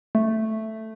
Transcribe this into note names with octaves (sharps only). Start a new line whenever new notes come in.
A3